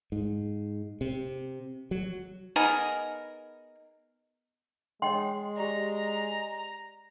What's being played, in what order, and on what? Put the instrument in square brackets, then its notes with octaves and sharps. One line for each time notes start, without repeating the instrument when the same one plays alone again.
[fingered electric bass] G#2
C3
F#3
[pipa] B3 D#4 G#4 A#4
[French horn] G#3 [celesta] C#5 D#5 [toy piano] F#5 G5 C6
[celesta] G4 D5 [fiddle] A#5